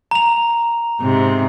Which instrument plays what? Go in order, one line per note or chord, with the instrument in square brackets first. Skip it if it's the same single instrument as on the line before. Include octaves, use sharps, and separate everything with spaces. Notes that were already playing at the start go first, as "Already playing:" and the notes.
[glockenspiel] A#5 F7
[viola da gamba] G#2 C3